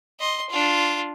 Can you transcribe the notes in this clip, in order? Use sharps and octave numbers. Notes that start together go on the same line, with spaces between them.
D#5 C6
D4 F4